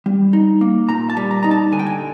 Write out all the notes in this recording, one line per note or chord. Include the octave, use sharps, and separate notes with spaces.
G3
D#4
A#3
A#2 A#5
A5
G3
A#5
D#4 A#5
A5
D3 G#5
G5
G#5